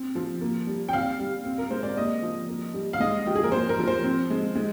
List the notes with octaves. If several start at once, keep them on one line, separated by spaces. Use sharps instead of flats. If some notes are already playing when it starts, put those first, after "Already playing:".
Already playing: C4
F3
A#3
G3
G5
C4 F5
G3
C4
A#4
G#3 C5
D5
A#3 D#5
F3
A#3
G3
F5
G#3 D#5
F3 G4
G#4
A#4
A#3 C5
A#4
F3
C5
C4
G#3
G#3